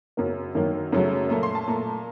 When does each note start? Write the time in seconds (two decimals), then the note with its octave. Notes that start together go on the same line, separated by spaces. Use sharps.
0.17 F#2 C#3 F#3 A#3
0.55 F#2 D#3 F#3 A#3
0.92 F#2 C#3 F#3 A3
1.30 A#2 A3 A#5
1.43 C6
1.55 A5
1.67 A#2 A3 A#5